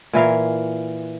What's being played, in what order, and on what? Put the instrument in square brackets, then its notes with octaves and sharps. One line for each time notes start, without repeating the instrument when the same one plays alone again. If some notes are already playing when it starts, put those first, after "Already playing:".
[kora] A#2 E3 A#4 F5